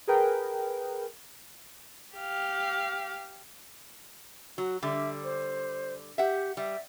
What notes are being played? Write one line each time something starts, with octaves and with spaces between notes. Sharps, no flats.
G#4 A#4 B4 G5
G4 F5
F#3 F#4
D3 G3 E5
C5
G4 E5 F#5
G3 E5